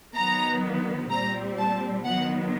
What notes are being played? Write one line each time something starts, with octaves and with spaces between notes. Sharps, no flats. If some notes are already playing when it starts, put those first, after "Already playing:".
D#3 F#3 B3 A#5
A#2 G3 C4 A#5
A5
D#3 F#3 B3 F#5